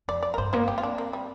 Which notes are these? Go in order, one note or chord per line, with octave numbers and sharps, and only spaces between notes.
F2 D5
D5
A#4
G2 C5
A#3 C5
C4 G4
F4
D4
A#3
G3